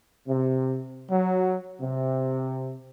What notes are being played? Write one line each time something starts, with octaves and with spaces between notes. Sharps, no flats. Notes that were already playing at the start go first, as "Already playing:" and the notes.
C3
F#3
C3